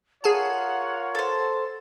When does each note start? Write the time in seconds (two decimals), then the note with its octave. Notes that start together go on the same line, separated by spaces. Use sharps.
0.24 F4 G#4 A#4 C#5 F#5 G#5 A5
1.15 A4 C5